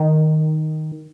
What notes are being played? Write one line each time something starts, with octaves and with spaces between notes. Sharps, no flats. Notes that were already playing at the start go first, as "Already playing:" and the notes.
Already playing: D#3